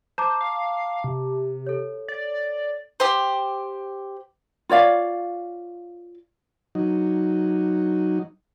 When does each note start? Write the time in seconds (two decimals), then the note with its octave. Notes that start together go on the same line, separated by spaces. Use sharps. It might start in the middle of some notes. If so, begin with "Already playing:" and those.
0.18 C5 A5 A#5 D6
0.41 F5
1.04 C3
1.67 A4 C#5
2.08 D5
3.00 G4 C5
4.69 F4 C#5 D5 F5
6.75 F#3 D#4